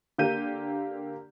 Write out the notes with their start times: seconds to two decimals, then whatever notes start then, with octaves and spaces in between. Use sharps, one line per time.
0.18 D3 A#3 G4 G6 D#7